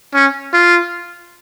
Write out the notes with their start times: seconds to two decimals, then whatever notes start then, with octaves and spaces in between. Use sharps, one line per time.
0.14 C#4
0.53 F4